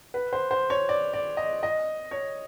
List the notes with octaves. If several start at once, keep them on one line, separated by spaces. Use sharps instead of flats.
B4
C5
C5
C#5
D5
D5
D#5
D#5
C#5